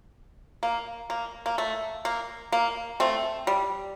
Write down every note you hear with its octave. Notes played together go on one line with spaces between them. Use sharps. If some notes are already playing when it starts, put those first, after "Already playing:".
A#3
A#3
A#3
A3
A#3
A#3
A3 C4
G3